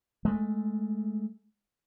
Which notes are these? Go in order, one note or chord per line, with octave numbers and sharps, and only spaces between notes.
G#3 A3